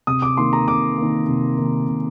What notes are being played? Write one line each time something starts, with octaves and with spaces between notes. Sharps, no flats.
C3 D#6
D6
D#3 A#3 C6
A#5
C3 D6
D#3 A#3
C3
D#3 A#3
C3